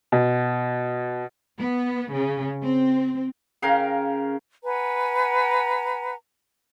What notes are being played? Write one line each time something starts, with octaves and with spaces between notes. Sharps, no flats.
B2
B3
C#3
C4
C#3 A#4 F5 G5
B4 F#5 G#5 A#5